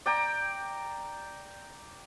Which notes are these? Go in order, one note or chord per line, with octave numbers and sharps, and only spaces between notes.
D5 G5 A#5